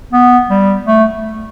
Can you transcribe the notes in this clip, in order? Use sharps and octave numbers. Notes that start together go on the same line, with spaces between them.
B3
G3
A3